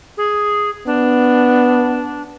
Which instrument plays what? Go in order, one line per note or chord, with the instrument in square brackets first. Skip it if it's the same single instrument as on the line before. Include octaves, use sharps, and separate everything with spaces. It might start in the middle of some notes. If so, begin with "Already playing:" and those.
[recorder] G#4
[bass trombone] B3 [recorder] D4